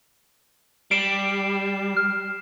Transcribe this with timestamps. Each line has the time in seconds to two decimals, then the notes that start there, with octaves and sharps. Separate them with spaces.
0.91 G3 C7 D7 E7
1.96 F6